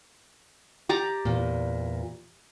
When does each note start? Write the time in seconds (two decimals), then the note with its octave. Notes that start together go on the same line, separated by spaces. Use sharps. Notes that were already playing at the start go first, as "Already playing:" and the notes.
0.89 G4 D5 A#5
1.25 E2 A#2